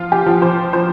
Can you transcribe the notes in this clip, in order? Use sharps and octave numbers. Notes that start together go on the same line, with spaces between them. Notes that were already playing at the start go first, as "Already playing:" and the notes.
Already playing: F3 F4
G4
F3
C5
F3 C5